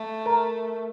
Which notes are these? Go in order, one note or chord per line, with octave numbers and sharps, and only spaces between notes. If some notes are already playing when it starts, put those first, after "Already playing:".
Already playing: A3
A#4